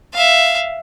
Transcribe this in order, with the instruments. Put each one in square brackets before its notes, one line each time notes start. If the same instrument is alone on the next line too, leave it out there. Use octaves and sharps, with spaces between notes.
[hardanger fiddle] E5 F5